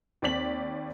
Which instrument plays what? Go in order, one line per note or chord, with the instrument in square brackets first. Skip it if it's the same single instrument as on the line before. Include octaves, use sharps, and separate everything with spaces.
[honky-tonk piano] D#2 C4 D5 B6 F#7